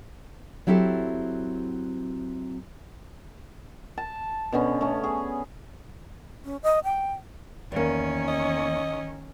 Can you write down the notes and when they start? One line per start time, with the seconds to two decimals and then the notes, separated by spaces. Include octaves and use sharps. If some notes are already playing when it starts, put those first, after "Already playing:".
0.67 F#3 C4 E4 G4 A4
3.98 A5
4.52 B2 D3 B3 C#4
4.81 A3 C#4
5.04 G#4
6.45 C#4
6.63 D#5
6.84 G5
7.72 E2 D#3 A#3 C#4
8.28 D#5